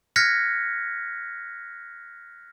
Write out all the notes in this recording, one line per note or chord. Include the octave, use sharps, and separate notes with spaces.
F6 F#6 G#6 A#6 B6 C#7